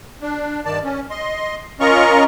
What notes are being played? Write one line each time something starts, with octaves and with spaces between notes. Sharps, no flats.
D4
G2 D#3 D5 A5
C#4
D#5 C6
C#4 F4 A#4 D#5 A#5 C#6